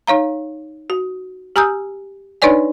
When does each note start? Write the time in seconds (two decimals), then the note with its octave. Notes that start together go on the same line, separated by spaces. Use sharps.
0.07 D#4 C#5 F5 A#5
0.90 F#4
1.56 G4 G#5 A#5 D#6 E6 G6
2.42 D4 D#4 B4 C#5 D5 G#5